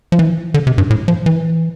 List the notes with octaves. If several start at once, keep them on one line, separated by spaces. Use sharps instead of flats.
F3
E3
D3
C3
G2
A2
F3
E3